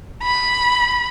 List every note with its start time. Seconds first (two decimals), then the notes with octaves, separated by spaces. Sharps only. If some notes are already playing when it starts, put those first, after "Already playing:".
0.23 B5